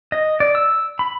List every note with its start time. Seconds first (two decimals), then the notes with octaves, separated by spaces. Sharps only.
0.12 D#5
0.40 D5
0.55 E6
0.99 B5